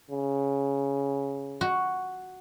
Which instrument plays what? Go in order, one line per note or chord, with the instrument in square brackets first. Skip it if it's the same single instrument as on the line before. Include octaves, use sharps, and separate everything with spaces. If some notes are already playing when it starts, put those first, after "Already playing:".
[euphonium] C#3
[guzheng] F#4